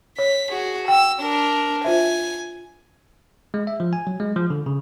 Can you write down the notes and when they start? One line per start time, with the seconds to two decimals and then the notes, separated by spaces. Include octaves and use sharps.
0.18 C#5 B6
0.51 F#4 G#4
0.88 G5 E6
1.21 D4 A#4
1.84 F4 C5 E5 G#5
3.54 G#3
3.67 E5
3.80 F3
3.93 G#5
4.07 F#3
4.20 G#3
4.36 F3
4.50 D3
4.66 C#3